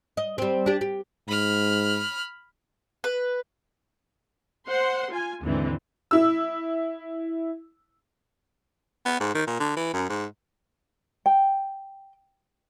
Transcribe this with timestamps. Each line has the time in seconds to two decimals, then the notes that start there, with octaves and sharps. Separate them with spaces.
0.17 D#5
0.38 G3 C4
0.66 D4 G4
0.81 G4
1.28 G#2 B5 F6
3.04 B4
4.68 C5 F#5 C6
5.11 F4 G#5
5.44 D#2 G#2 D3 E3 C4
6.11 E4 E6
9.06 B3
9.20 G#2
9.35 D#3
9.47 A#2
9.60 D3
9.76 E3
9.93 F#2
10.09 G#2
11.26 G5